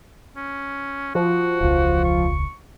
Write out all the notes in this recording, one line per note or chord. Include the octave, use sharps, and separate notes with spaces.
C#4
F3 F#4
E1 C#2 F4
C#6